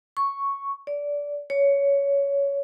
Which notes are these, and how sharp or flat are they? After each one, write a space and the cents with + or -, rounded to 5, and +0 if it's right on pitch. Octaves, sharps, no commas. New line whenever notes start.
C#6 +0
D5 -20
C#5 +15